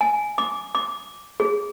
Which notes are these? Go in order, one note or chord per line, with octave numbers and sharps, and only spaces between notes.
G#5
D6
D6
G#4